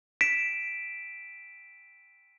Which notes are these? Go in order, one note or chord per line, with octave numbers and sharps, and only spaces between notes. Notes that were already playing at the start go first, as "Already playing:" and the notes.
B6 D7 E7